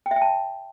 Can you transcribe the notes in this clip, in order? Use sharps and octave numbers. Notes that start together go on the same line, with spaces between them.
G5
E5
G5
A5